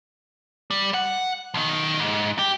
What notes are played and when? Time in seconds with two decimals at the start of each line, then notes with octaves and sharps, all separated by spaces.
0.71 G3
0.94 F#5
1.54 B1 D#3
2.00 G#2
2.39 G4